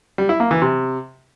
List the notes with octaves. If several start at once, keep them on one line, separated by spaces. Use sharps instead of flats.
G3
E4
A#3
E3
C3